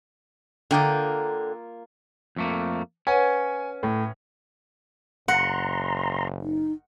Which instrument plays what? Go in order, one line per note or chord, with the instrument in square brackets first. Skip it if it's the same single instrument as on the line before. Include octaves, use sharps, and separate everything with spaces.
[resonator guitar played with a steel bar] D3 G5 [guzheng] A#3 F4 D#5
[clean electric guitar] F2 A3 A#3
[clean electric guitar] C#4 [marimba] B4 C#5 F#5 [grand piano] G#5
[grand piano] A2
[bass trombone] F#1 [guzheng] F#5 [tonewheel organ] A#5 C6
[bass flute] D#4